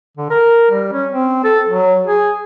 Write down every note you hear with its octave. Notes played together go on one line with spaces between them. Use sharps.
D3
A#4
G3
C#4
C4
A4
F#3
G#4